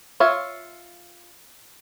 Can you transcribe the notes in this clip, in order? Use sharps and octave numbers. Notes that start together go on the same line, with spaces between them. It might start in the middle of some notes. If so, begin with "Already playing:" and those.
F4 C#5 E5